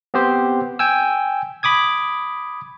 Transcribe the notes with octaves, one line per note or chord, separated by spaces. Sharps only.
B3 C4 G4 C5
G5 G#5 E6
B5 D6 D#6 G#6